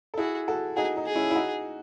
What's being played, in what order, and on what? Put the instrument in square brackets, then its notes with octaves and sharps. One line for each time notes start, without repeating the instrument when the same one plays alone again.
[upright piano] A4
[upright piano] E4 G#4 [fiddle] F#4
[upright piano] F#4 A4
[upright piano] D#4 F#4 [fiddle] G#4
[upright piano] D#4
[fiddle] G#4
[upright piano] C#4 E4
E4
D#4 F#4